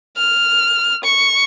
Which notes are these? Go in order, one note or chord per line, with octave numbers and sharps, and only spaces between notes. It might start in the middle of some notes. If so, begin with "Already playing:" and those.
F6
C#6